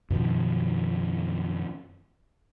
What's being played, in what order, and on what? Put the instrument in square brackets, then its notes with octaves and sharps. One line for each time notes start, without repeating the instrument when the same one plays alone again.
[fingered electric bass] F#2 B2 D#3 F3